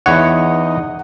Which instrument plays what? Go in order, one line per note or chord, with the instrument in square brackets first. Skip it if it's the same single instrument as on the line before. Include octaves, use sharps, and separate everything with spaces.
[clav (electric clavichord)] E2 C#5 [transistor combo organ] D#4 [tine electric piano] F#5